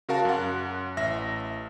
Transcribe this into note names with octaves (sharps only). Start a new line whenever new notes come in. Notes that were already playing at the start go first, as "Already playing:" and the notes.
C#3 F#4 A#4 F5 A5
F#2 F#5
A1 E5 A#6